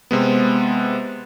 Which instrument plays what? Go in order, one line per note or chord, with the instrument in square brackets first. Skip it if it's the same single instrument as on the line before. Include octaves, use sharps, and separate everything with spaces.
[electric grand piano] C3 G#3 B3